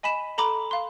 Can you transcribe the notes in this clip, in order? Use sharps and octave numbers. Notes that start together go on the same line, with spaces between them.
D#5 G#5 B5 B6 E7
A4 A#5 B5 D6
F5 C6